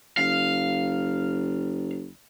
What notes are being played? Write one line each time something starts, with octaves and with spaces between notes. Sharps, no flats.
F#1 F5